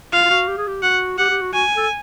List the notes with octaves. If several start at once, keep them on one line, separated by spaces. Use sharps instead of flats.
F4 F5
F4
F#4
G4
G#4
G4
F#4 F#5
G4 F#5
G4
F#4
F#4 G#5
A4